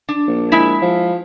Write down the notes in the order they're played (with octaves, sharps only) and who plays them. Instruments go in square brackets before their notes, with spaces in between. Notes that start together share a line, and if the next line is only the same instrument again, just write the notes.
[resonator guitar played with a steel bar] D4
[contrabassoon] A#1
[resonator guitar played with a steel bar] G#3 E4 E5
[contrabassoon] F3